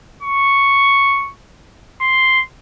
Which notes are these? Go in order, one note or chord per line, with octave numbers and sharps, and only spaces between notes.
C#6
C6